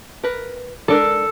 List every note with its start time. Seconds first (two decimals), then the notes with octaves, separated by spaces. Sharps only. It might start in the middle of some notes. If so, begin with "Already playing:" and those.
0.24 A#4 B4
0.88 G#3 D4 A4 A#4